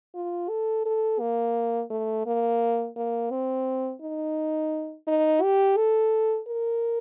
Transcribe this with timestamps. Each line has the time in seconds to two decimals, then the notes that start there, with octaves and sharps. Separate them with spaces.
0.15 F4
0.49 A4
0.85 A4
1.20 A#3
1.90 A3
2.26 A#3
2.96 A#3
3.31 C4
4.02 D#4
5.07 D#4
5.42 G4
5.77 A4
6.48 A#4